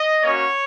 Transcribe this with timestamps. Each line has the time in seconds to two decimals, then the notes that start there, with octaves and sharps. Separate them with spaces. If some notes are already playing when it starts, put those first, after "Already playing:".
Already playing: D#5
0.23 A#3 C#4 F#4 C#5